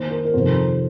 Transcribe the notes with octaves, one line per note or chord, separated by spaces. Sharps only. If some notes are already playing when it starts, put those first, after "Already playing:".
Already playing: D#3 A#3 D#4 C5
A#4
A#4
F2 C3 D#3 C5